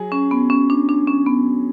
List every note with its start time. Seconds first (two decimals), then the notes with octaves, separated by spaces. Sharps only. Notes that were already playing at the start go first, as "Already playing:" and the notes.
Already playing: F#3 G#4
0.12 C#4
0.31 B3
0.50 C#4
0.70 D4
0.89 D4
1.07 C#4
1.26 B3